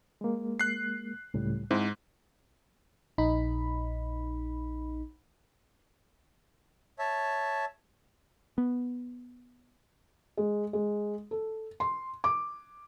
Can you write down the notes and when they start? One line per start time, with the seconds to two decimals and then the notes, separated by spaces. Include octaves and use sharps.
0.21 G#3 A#3
0.60 F#6 C7
1.34 C#2 A2 G3
1.71 G#2 G#3 C4 E4
3.18 A#1 D#4 B5
6.99 C#5 E5 A5
8.58 B3
10.37 G#3
10.73 G#3
11.31 A4
11.80 C6
12.24 D6